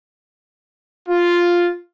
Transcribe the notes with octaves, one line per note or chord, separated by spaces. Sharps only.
F4